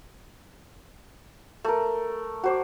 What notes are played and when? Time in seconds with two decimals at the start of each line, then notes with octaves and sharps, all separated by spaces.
1.64 A3 A#4
2.44 F#4 C5 D5